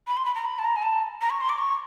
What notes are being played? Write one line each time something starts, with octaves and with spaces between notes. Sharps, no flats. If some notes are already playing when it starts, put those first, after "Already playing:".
B5
C6
B5
A#5
B5
A5
A#5
G#5
A5
A#5
C#6
C6
D6
C#6